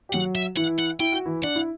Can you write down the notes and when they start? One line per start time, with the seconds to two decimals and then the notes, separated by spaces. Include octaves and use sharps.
0.09 G4
0.14 F#3 F#4 F#5
0.35 E5
0.57 E3 E4 F#5
0.79 F#5
1.00 E4 G5
1.12 F#4
1.26 E3 E4
1.43 D4 F#5
1.56 E4